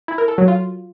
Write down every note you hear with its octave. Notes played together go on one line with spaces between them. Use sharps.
E4
A#4
A4
F#3
F4